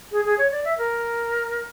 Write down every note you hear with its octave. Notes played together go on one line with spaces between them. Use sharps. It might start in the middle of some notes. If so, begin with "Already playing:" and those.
G#4
G#4
C#5
D5
E5
A#4